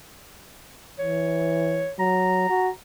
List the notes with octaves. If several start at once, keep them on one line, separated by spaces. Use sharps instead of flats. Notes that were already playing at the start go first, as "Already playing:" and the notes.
E3 C#5
F#3 A#5
F#4